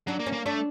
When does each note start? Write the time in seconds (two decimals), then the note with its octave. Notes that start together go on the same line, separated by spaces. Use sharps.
0.07 F#3 D4
0.20 A#3
0.26 C#4
0.33 A#3
0.46 A3 D4